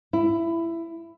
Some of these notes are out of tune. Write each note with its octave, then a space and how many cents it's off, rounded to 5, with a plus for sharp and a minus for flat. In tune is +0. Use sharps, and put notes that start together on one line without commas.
E4 +15